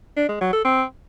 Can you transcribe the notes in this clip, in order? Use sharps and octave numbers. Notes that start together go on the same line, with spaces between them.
D4
G#3
F#3
A4
C4